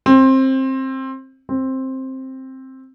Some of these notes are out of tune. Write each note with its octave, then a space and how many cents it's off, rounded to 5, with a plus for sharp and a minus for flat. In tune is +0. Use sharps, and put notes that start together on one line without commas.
C4 +20
C4 +10